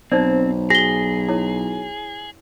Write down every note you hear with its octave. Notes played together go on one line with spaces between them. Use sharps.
B1 C4 D#4 C5 D5
F#4 G#4 A#6 G7
E4 C#5